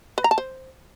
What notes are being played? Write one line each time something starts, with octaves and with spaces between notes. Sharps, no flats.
B4
A#5
A5
C5